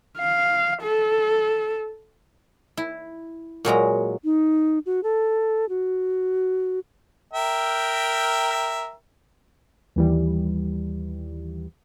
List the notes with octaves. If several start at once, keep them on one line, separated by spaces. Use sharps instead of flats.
F5
A4
E4
A#2 F#3 G#3 A#5
D#4
F#4
A4
F#4
A#4 E5 G5
D#2 E3 G3